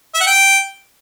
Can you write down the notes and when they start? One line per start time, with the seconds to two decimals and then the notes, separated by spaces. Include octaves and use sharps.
0.15 E5
0.21 F#5
0.27 G5